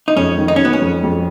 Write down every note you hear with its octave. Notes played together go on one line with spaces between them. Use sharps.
D#4
F2 C#4
D#3
D#4
C#4
F#3
B3
C#4
F2
F2